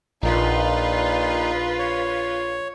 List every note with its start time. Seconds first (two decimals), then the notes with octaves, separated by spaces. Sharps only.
0.23 A#1 A#2 D#4 F4 B4
1.79 C#5